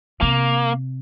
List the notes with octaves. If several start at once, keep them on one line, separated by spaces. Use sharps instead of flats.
C3 A#3